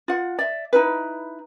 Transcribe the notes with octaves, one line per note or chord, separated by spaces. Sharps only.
F4 F#5
D5 E5
D#4 E4 B4